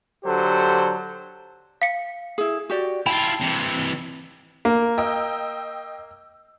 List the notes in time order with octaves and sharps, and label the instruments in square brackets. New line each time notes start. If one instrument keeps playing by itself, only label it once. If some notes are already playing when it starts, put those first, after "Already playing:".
[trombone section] D3 F#3 G4 A4 C5
[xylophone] F5 C#7
[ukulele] E4 G#4
F#4 G4 D5
[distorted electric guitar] E4 F4 [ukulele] G5 A5 [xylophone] B5
[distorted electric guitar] C3 E3
[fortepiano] A#3
[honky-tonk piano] D#5 G5 E6